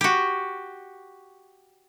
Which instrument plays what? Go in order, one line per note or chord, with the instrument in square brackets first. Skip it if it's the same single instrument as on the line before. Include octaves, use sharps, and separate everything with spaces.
[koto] F#4 G4